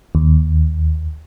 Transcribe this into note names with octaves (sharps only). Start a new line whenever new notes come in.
D#2